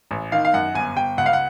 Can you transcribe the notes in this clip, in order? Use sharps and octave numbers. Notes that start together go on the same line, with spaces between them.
A1
D#3 F5
F5
F#2 F#5
G1 G#5
G1 G5
C#2 F#5
F5
F#5